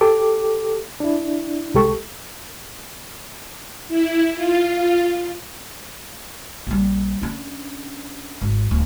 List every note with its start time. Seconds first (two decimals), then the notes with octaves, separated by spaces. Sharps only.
0.01 G4 A4 D6
1.00 D4 E4
1.74 C2 G#3 G4 A4 C#6
3.88 E4
4.34 F4
6.67 A#1 G3
7.22 C#4 D4
8.41 G#1
8.71 D1